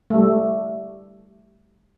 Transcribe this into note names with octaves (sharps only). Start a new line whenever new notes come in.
G3 A3